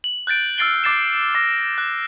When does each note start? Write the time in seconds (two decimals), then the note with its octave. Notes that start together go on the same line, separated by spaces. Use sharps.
0.04 F#7
0.27 F#6 G6 A6 D7
0.58 E6 F6 A6 C7 D7 G7
0.84 D6 A6 C7 E7
1.35 D6 A#6 E7
1.78 F#6